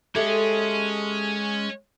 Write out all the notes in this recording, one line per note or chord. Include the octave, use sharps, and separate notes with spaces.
G#3 C#4 G4 A4 E5